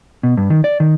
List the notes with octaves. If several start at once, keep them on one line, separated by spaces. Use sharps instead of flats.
B2
G2
D#3
D5
D#3